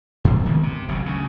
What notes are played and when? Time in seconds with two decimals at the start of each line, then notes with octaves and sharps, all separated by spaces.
0.25 G2 C3 F3 F#3
0.45 D2 D#3 G#3 B3
0.63 C3
0.88 F#1 F#2 B2
1.06 D2 C#3